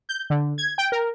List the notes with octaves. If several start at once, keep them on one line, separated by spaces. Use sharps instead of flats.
G6
D3
G#6
G5
A#4